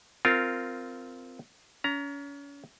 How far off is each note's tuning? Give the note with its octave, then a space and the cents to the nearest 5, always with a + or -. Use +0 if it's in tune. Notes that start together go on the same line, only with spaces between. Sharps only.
C4 -15 F4 +0 A#4 -15
C#4 +35 A#5 +5